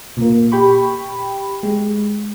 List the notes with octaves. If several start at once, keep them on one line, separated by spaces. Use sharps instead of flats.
A#2 A#3
G4 G5 B5 C#6
G#3